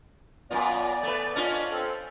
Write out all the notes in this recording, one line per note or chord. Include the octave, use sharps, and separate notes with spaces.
F#2 A#2 B3 F4 D5
A3 B4
C#4 D4 F4
C4 A4